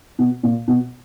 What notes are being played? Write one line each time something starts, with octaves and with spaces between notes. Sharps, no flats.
B2
A#2
B2